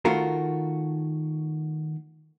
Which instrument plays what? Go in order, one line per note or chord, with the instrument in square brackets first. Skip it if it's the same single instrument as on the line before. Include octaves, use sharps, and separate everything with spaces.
[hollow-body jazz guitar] D#3 A3 F4 F#4 A#4